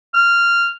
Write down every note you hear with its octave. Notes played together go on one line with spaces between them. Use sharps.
F6